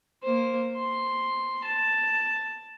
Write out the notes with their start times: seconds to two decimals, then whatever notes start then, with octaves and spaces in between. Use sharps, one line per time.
0.23 A#3 C5
0.77 C6
1.64 A5